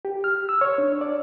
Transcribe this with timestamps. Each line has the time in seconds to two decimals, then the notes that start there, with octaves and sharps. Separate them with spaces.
0.05 G4
0.24 F6
0.49 E6
0.61 C#5
0.78 D4
1.01 D5